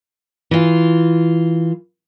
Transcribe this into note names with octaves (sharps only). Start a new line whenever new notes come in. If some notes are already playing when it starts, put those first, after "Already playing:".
E3 F4